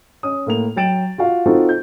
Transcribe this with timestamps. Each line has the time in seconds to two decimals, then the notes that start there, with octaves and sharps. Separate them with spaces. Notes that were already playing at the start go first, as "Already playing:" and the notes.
0.23 C#4 D#6
0.46 A2 A#3 F7
0.76 F#3 G5 A6 D7 E7 F#7
1.18 F4 F#4 F5
1.46 C4 D#4 F4 F#4 A4 C5
1.69 G6